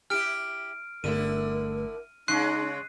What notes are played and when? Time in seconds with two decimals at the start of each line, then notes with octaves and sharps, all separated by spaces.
0.10 E4 G4 F6 D7
1.04 G1 D3 A3 E4 A#4 D#7
2.28 C#3 G#3 D#4 C6 C#6 F#6 C7 D#7